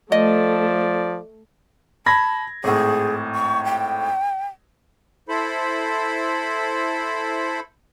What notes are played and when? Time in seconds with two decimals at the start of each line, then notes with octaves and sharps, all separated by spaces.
0.12 F3 A3 D5 D#5
2.06 A5 B5 G#6 A#6
2.64 G#1 A2 G#4
3.35 C#6
3.65 G5
5.29 E4 A4 C5 B5